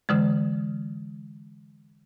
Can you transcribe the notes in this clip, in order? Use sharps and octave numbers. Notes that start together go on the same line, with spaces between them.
D3 E3 G#3